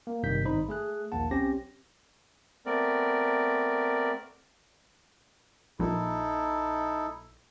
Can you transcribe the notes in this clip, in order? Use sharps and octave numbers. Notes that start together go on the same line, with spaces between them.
A#3
G#1 G2 C3 D#3 G6 B6
G#1 D#4 C5 B5
A3 G#4 F#6
A#1 D#2 A#3 F#5 A5
B1 C4 C#4 G4 A#6
A3 B3 C4 A#4 D5
A#1 D#4 E4 A4